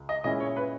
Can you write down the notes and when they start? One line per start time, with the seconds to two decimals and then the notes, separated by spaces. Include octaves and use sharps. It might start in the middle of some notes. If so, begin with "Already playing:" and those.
Already playing: C#2
0.09 D#5
0.24 A#2 G#3 C#4 E4 D#5
0.40 C#5
0.56 B4